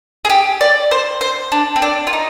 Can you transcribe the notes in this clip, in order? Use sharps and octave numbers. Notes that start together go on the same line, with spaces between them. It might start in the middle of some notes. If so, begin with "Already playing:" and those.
G#4
G4
D5
C5
C5
D4
C4
D4
F4
D#4